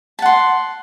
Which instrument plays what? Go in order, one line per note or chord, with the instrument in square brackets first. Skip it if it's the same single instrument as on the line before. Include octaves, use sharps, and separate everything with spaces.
[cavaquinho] A5
F#5
C6